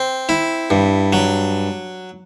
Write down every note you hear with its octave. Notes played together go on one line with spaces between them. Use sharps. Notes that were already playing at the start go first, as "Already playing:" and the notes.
Already playing: C4
E4
G2
F#3